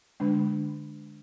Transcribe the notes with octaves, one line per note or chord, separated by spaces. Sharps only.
D3 G#3 D4